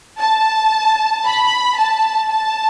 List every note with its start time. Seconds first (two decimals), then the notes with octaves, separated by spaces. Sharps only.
0.19 A5
1.26 B5
1.78 A5
2.31 A5